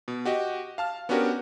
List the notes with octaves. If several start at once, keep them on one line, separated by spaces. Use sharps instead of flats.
B2
F#4 G4 D#5
F5 A5 F6
B3 C#4 D4 F#4 G4 A#4